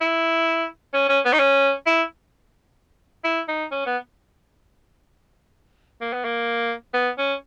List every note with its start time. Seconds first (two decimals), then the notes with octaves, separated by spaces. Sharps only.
0.01 E4
0.94 C#4
1.09 C#4
1.25 B3
1.33 D#4
1.39 C#4
1.86 E4
3.24 E4
3.48 D#4
3.71 C#4
3.86 B3
6.01 A#3
6.13 B3
6.24 A#3
6.94 B3
7.18 C#4